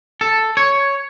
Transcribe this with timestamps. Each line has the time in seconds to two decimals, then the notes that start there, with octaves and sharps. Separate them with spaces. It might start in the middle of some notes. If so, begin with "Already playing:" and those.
0.21 A4
0.57 C#5